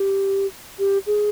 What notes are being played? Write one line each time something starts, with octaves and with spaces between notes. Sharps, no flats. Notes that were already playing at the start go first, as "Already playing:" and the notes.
Already playing: G4
G4
G#4